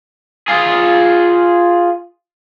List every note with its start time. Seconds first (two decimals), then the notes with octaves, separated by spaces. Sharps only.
0.48 F4 G#4